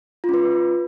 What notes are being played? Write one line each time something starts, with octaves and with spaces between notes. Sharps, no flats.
C#4 F4 B4